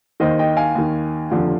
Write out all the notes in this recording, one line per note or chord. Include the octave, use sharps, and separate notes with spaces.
D#2 D#3 C5 D#5
D#5 G5
F5 G#5
D#2 D#3
F1 D#2 D3 F3